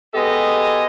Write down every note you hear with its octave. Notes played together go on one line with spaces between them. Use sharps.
G#3 B3 G4 A4 D#5 G#5